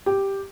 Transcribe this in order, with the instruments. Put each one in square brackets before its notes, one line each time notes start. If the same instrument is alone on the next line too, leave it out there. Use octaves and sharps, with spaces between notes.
[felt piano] G4